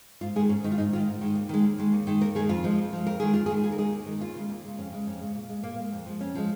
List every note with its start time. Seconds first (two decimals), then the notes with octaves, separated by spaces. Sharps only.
0.21 G#2 F4
0.36 D#3 G#3 G#4
0.49 G#2 C#4
0.64 D#3 G#3 D#4
0.72 F4
0.78 G#2 D#4
0.93 D#3 G#3 F4
1.07 G#2
1.21 D#3 G#3
1.35 D#2
1.49 D#3 G#3
1.64 D#2
1.78 D#3 G#3
1.92 D#2
2.07 D#3 G#3
2.21 D#2 A#4
2.35 D#3 G#4
2.39 G#3
2.49 F2 F4
2.64 F3 G#3
2.78 F2
2.93 F3 G#3
3.06 F2 A#4
3.20 D#3 G#3 G#4
3.34 F2 F4
3.46 G#4
3.50 D#3 G#3
3.64 D#2 G#4
3.72 A#4
3.78 D#3 G#3 G#4
3.92 D#2
4.06 D#3 G#3
4.20 D#2 F4
4.35 C#3 G#3
4.50 D#2
4.64 C#3 G#3
4.78 F2 C#4
4.92 C#3 G#3
5.06 F2 C#4
5.21 C#3 G#3
5.35 A#2
5.49 G#3
5.63 A#2 A#3
5.78 G#3
5.92 F2
6.06 F3 G#3
6.21 F2 C#4
6.35 F3 G#3